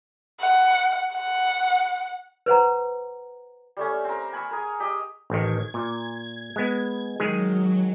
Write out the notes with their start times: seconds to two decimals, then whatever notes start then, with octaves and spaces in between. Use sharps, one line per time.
0.41 F#5
1.15 F#5
2.46 B4 C5 F#5 A#5
3.77 G3 A3 C#4
4.04 C4 A#4
4.33 G#5 B5 C#6 E6
4.51 G#4 A#4
4.80 G4 D#5
5.30 A1 D#3 G#6
5.74 A#2
6.56 G#3 B3
7.20 D#3 F#3 G#3 G#4